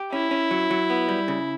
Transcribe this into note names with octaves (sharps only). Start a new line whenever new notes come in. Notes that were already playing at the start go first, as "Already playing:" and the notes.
Already playing: G4
C#4 E4
C#4
F#3
F#3
B3
G3
C#3